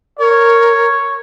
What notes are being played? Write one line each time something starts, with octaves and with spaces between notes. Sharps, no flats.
A#4 C#5